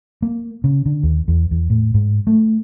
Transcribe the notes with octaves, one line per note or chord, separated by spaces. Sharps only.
A#3
C#3
D3
D#2
E2
E2
A2
G#2
A3